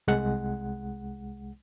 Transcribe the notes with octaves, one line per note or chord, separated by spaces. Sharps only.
C2 G#3 F#5